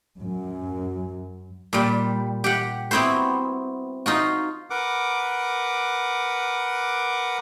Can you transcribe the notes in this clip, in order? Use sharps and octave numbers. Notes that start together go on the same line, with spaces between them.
F#2
A#2 G3
G4 F#5
B3 C4 E4 F#4 C5
D#4 F4 F#4
A#4 B4 F#5 D6